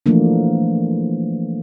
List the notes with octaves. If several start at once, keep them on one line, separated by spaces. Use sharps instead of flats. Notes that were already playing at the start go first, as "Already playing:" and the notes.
E3 F3 A3 A#3 D4